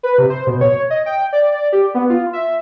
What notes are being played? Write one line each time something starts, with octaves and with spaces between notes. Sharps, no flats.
B4
C3
C5
B2
C#5
D#5
G5
D5
G4
B3
F4
E5